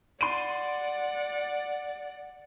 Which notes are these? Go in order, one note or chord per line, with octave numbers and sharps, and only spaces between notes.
D5 F#5 C6 D#7